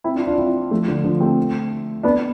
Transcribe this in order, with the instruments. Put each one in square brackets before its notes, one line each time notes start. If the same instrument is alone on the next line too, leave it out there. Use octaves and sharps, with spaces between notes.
[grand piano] C4 E4
D4 F4
D4 F4
C4 E4
F3 A3
D3 F3
D3 F3
A3 C4
B3 D4